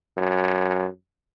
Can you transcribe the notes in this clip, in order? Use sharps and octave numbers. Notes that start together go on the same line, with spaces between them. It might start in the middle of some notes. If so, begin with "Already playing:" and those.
F#2